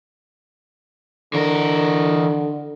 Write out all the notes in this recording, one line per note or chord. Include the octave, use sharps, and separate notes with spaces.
D3 E3 A#4